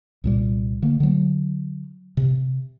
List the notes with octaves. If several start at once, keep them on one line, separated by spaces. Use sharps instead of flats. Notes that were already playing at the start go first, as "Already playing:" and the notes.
C2 A#2 G3
D3 A3 A#3
D3 F#3
C3